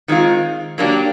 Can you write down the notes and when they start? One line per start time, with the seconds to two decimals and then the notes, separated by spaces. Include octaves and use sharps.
0.08 D#3 G#3 C4 F4
0.78 F#3 A#3 D4 G4